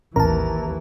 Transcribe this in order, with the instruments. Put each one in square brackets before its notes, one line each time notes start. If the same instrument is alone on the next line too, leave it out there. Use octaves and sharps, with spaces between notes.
[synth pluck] A1 [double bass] D#2 E3 [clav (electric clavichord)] A#4 [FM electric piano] A5 A#5